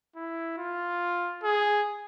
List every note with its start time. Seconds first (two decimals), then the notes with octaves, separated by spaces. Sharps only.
0.16 E4
0.58 F4
1.44 G#4